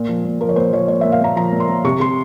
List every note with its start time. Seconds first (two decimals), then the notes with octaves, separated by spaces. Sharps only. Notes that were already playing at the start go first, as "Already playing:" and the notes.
Already playing: A#2
0.09 F3
0.24 A#2
0.41 F3 A#4
0.49 C#5
0.56 A#2 C5
0.73 F3 C#5
0.88 A#2 C#5
1.01 A#2 E5
1.12 F5
1.21 A#2 A#5
1.36 F3 A#5
1.52 A#2
1.60 C6
1.69 A#2
1.85 C3 C#6
2.00 C3 C6